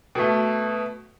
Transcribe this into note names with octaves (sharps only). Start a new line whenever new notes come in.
B2 A3